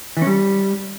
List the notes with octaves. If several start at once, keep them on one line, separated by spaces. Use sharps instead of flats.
E3
C#4
G3